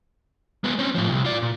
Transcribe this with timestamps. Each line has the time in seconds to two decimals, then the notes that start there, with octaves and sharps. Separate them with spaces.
0.64 G#3 B3
0.79 C4 C#4
0.95 A2 F3
1.10 C2
1.25 F4 D5
1.42 A#2